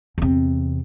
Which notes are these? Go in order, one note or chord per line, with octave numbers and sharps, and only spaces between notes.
E2 C3